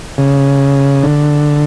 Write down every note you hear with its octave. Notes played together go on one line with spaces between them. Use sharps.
C#3
D3